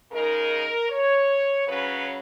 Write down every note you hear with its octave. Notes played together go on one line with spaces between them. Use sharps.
C#3 G#3 D#4 A#4
C#5
C#3 F#3 C#4 B4